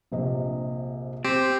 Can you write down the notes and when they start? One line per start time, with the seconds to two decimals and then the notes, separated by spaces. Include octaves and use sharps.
0.12 A#1 C3 D#5
1.25 C4 G4